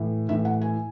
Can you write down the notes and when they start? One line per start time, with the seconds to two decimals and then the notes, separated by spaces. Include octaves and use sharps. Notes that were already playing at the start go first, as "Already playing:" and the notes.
Already playing: A2 E3
0.29 A2 E3 E5
0.45 F#5
0.61 G#5